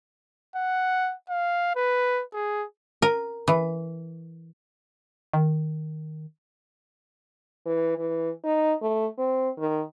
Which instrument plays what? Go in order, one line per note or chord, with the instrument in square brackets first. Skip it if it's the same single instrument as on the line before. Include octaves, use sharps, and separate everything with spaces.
[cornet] F#5
F5
B4
G#4
[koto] A#4
E3
[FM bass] D#3
[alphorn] E3
E3
D#4
A3
C4
D#3